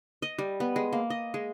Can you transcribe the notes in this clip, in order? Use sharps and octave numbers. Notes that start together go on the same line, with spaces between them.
D#5
G3
B3
G#3
A#3
D#5
G#3